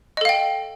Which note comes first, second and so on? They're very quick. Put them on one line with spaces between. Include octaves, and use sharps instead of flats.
D#5 A4 F5 G5